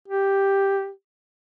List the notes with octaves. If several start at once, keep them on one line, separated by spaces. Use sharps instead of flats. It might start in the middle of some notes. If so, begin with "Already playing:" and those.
G4